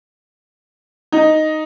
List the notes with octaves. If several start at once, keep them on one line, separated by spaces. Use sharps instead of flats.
D#4